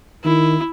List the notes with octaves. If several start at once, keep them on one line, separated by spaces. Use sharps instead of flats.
D#3 E4